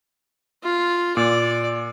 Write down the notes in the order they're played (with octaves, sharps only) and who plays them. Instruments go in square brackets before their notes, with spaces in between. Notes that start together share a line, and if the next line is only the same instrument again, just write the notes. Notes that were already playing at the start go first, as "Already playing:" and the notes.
[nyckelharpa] F4
[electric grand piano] A#2 [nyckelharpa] D5